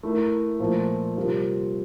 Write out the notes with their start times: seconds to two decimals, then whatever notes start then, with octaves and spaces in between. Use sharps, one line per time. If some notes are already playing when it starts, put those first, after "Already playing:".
0.03 A3 E4 A#4
0.60 A#2 F3 A3
1.16 C3 G3 C4 F4 A#4